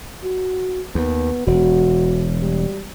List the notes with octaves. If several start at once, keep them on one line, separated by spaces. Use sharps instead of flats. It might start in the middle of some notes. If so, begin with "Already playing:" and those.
F#4
D#2 B3
E1 F#4
G3